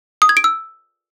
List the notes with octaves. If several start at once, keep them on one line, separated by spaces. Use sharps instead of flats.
D#6
G#6
D7
E6